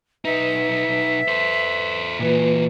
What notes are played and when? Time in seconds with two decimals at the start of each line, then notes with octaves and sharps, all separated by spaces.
0.25 B1 D#4 B4 E5
1.28 A4 C5
2.19 A#2 E3 A#3 F4 B4